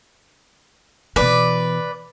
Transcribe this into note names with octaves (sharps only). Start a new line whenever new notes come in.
B2 E3 B4 D5